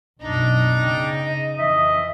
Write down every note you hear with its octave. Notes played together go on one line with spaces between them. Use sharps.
B1 F#2 D4 D#4 A#5
C#3 G5
D#5
F2 E3 D#5 E5